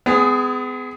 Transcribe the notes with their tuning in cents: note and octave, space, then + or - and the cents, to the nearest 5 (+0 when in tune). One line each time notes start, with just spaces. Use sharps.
G#3 +0 B3 +40 G#4 +0